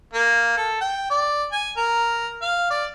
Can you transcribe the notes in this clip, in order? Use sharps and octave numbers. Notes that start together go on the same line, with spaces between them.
A#3
A4
G5
D5
G#5
A#4
F5
D5